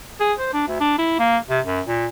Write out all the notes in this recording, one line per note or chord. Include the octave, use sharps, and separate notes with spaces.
G#4
C5
D4
D2
D4
E4
A#3
C3
F#2
A#2